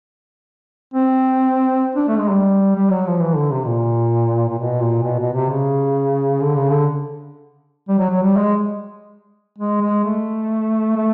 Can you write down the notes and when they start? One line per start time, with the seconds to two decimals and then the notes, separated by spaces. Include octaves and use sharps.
0.94 C4
1.96 D4
2.08 A3
2.19 G#3
2.31 G3
2.76 G3
2.90 F#3
3.07 F3
3.21 E3
3.36 D3
3.51 C3
3.66 A#2
4.49 A#2
4.58 B2
4.81 A#2
5.03 B2
5.19 B2
5.33 C3
5.49 C#3
6.41 D3
6.56 C#3
6.71 D3
7.89 G3
7.99 F#3
8.10 F#3
8.22 G3
8.37 G#3
9.58 G#3
9.81 G#3
10.04 A3
10.96 A3